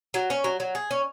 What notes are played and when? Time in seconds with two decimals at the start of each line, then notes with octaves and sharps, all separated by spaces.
0.14 F#3
0.30 C#4
0.44 F#3
0.60 F#3
0.75 G#4
0.91 C#4